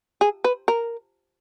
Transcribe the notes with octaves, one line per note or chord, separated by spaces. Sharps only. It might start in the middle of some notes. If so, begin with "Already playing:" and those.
G#4
B4
A#4